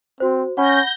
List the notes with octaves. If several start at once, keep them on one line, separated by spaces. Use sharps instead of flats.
C4 F#4 C5
C#4 F#5 B5 G6 A#6